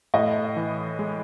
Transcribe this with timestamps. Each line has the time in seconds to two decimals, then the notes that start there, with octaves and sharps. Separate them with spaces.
0.14 A2 D#5
0.57 E3
0.99 G#3